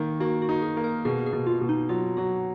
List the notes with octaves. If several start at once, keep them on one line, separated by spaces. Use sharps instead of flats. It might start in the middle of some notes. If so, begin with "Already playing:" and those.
Already playing: D#3 A#3
A#3 F#4
F#4
D#4
G#4
A#3
A#4
B2 G#4
G#4
B2
F4
B2
D#4
F#3 F4
F#3 F#4